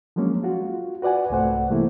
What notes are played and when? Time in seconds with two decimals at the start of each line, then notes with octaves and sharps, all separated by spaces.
0.16 F3 F#3 G#3 A#3 C#4
0.44 F4 F#4
1.02 F#4 B4 D5 F#5 G#5
1.30 C2 G#2 C3 A3 C5 F#5
1.70 C3 E3 G3 A3 A#3 E4